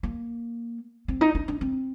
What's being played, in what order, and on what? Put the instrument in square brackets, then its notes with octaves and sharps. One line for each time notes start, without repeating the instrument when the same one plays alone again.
[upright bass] A#3
C4
D#4
D4
D4
C4